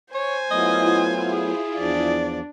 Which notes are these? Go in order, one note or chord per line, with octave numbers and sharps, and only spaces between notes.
C5 C#5 G#5
F#3 A3 B3 E4 F4 D#5
G#4
E2 F3 D4 D5